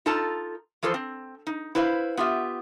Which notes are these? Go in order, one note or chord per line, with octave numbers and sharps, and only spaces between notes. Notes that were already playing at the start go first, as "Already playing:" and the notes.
D#4 F4 A4 A5 A#5
E3 F3 F4 A4 C5
C4
D#4
E4 B4 C5 F5
B3 F4 G4 E5